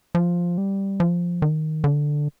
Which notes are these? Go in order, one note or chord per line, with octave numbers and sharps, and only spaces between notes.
F3
G3
F3
D#3
D3